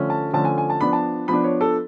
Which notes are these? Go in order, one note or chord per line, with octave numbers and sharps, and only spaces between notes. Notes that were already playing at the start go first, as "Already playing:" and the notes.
Already playing: D3 F3 A3 C#4
A5
D3 F3 A3 C#4 A5
G#5
G#5
A5
F3 B3 D4 B5
A5
F3 B3 D4 B5
C#5
A4